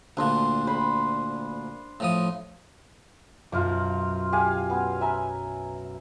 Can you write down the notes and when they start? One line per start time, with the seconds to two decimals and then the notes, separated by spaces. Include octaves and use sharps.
0.17 D2 A#2 D4 C6
0.67 C5 B5
2.00 A2 F3 D#6
3.52 B1 F#2 F4 F5 D6
4.32 G4 F5 G#5
4.70 B3
5.01 B4 E5 G#5 A#5